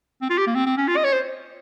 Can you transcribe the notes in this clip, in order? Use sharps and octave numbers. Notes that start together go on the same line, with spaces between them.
C4
F4
G4
A#3
C4
C4
C#4
F4
D#5
C#5
C5